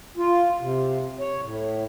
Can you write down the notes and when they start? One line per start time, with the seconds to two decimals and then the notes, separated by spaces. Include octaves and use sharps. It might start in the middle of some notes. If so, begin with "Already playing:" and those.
0.17 F4
0.61 C3
1.20 C#5
1.42 A2